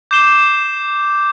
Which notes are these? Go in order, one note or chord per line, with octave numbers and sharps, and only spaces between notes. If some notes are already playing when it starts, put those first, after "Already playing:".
D6 G6 C7 E7 G7